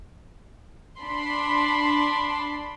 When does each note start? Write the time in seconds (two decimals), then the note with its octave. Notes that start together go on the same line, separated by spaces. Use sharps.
0.99 D4 B5 C6